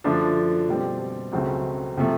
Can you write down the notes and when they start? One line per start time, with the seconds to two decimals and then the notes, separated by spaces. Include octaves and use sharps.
0.04 F#2 D3 F3 A3 D4
0.68 B2 G3 C4
1.32 C#2 C#3 F#3 A3 C4
1.97 C3 F3 A3